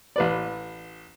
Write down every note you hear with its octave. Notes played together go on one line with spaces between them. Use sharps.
A1 B4 D5